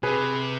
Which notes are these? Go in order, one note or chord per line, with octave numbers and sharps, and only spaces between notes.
C3 G#4 B4